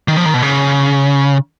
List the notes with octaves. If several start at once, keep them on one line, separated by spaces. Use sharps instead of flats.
D#3
F3
D#3
B2
C#3